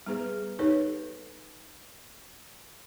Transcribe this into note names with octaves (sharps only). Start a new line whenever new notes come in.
G3 B3 G#4 B4
D#4 G4 A4 B4 C#5